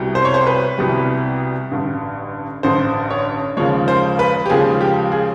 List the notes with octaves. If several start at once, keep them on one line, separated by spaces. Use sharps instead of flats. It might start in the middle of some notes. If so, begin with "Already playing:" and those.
Already playing: C2 B2 G3
C5
C#5
C5
B4
C2 B2 G3
A1 G2 D3
A1 G2 D3 C5
C#5
D#2 C#3 F3 G#3 C#5
C5
B4
G4
D#2 C#3 F3 G#3 G#4
G4
G#4